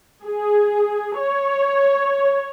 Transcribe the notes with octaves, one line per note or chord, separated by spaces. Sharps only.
G#4
C#5